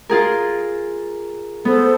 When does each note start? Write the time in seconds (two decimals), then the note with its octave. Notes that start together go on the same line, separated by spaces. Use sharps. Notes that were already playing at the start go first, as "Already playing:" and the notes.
0.09 F4 G#4 A#4
1.65 B3 A4 C5